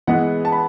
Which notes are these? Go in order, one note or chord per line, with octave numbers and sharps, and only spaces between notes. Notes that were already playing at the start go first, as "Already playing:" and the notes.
E3 G#3 B3 F#5
A5
B5